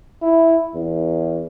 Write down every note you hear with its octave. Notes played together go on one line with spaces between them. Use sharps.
E4
E2